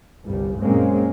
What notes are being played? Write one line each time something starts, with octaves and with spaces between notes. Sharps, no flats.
G1 C2 G3
F#2 A#2 G#3 A#3 C4 C#4